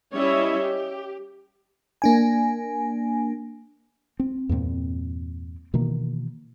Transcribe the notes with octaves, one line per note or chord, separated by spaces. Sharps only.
G3 C#4 E4 C#5 D#5 E5
G4
A#3 D4 G#5
C4
E2 G2 A#2 C4
B2 D#3 E3 A#3